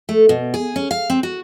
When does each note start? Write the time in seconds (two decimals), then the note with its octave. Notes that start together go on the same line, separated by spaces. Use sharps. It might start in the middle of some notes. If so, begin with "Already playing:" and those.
0.09 A3
0.29 B2
0.54 G#4
0.76 C#4
0.91 F5
1.10 C4
1.23 F#4